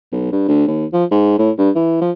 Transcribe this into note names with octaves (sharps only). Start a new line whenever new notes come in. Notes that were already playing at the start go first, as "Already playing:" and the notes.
B1
G2
D2
D#2
F3
G#2
A2
G2
E3
F3